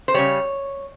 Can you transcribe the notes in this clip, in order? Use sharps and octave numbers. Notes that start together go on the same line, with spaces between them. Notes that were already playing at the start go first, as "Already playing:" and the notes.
C5
C#3 G3 C#5